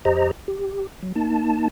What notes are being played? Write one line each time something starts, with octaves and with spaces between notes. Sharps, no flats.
F2 G4 C5 D#5 A#5
G4
F#3
A#3 D#4 A5